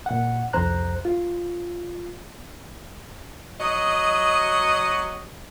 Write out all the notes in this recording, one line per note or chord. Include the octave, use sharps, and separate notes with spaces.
A#2 F#5
C2 F2 C5 A#5 F#6
F4
F#3 D#5